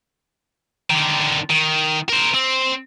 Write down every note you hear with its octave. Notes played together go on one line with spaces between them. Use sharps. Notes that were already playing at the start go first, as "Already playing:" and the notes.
D3 D#3
D#3
A#4 C5
C4